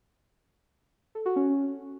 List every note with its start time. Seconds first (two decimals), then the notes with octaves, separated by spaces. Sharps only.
1.15 A4
1.26 F#4
1.36 C#4